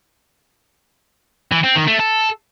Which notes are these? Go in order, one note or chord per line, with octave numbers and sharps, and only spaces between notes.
E3
C4
D#3
A3
A4